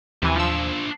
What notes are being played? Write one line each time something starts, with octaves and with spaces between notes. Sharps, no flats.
D#2 C3 E3 F3 G#5
F3 D4 F4 E6